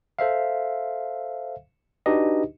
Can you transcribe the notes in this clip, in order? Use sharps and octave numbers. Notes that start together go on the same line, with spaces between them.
A4 C5 E5 F5
D4 D#4 F#4 G4 B4 D#5